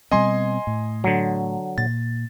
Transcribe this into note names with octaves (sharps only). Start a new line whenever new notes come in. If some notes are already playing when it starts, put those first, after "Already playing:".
B2 G3 C4 D#5 G#5 C6
A2
D3 F#3
A#2 A6